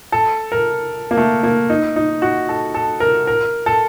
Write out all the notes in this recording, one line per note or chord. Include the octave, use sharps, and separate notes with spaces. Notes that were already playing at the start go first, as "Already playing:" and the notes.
A4
A#4
A#3
A3
A#3
D#4
D#4
F#4
A4
A4
A#4
A#4
A4